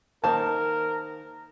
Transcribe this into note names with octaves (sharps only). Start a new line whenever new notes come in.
D#3 A#3 A#4 C5 A5